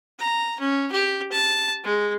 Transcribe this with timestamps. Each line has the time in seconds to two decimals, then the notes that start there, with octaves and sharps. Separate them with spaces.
0.19 A#5
0.59 C#4
0.92 G4
1.32 A5
1.84 G#3